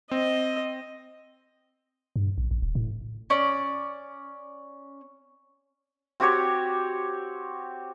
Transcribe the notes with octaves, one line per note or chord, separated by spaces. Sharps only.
C4 D#5
G2
A#1
A1
D#1
A2
C#4 D5
C4 F#4 G4 C#5